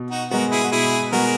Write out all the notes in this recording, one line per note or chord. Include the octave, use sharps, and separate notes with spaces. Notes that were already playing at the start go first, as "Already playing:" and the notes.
Already playing: B2
D#4 F#4
G#3 B3 F#4 A#4
E4 G#4
F#4
B2 E4 G#4
G#3 B3 F#4 A#4